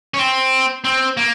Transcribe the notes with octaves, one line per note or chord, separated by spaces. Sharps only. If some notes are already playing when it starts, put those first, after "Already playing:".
C#4
C4
C4
A#3